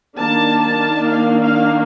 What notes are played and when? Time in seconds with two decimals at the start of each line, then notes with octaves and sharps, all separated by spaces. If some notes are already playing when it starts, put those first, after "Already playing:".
0.16 D#3 A#3 D4 A5
0.62 A5
1.09 F5
1.41 F5